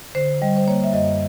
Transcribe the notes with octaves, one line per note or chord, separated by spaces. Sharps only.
D3 C5
G3 D#5
C5
A#3 C#5
E5
F#2 D#5